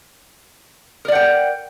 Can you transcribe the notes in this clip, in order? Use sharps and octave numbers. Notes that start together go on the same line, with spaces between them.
A#4 D5 F#5 G5